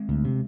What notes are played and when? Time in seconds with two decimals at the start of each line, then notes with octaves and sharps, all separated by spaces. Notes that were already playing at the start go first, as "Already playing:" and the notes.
Already playing: G#3 C4
0.09 D2
0.25 C3